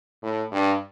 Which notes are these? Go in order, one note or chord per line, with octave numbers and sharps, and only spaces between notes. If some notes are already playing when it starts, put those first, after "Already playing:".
A2
G2